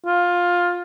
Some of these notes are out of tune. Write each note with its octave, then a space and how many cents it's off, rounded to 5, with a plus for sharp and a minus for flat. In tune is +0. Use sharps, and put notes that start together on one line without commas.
F4 +15